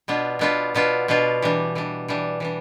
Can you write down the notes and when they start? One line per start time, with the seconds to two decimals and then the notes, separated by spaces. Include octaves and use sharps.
0.08 B2 B3 D4 F4
0.39 B2 B3 D4 F4
0.75 B2 B3 D4 F4
1.08 B2 B3 D4 F4
1.42 E3 G3 D4
1.75 E3 G3 D4
2.08 E3 G3 D4
2.40 E3 G3 D4